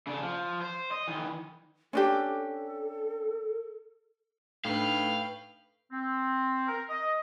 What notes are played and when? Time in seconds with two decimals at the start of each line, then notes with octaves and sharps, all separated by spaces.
0.07 C#3 D4
0.23 F3
0.62 C5
0.91 D#5
1.08 D#3 E3
1.93 C#4 D4 G4 A4
4.65 A2 D4 D#4 B4 F5 G5
5.92 C4
6.68 A#4
6.90 D#5